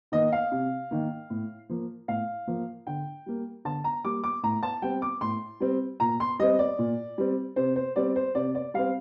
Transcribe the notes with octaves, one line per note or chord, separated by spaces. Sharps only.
D#3 A#3 D#5
F5
C3
D#3 A#3
A2
F3 A#3
A2 F5
F3 A#3
D3 G5
G3 A#3
D3 A5
A#5
G3 A#3 D6
D6
A2 A#5
A5
G3 C4 G5
D6
A2 C6
G3 C4
A#2 A#5
C6
G3 C4 D#5
D5
A#2
G3 C4
C3 C5
C5
G3 C4 D5
C5
C3 D5
D5
G3 C4 F5